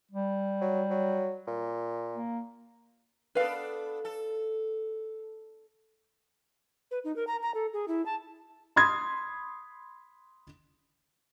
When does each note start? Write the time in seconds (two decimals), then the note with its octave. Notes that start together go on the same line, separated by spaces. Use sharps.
0.11 G3
0.61 F#3
0.90 F#3
1.47 A#2
2.14 A#3
3.35 B3 D4 A4 B4 F5
4.05 A4
6.91 B4
7.04 D#4
7.16 A#4
7.27 A#5
7.42 A#5
7.55 A4
7.73 G#4
7.88 E4
8.06 A5
8.76 B5 C6 D#6 G#6